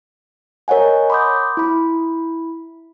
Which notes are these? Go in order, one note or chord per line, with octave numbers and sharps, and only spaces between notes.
A#4 C#5 D#5 F#5 G#5
B5 C6 D6 D#6 G6
E4 B5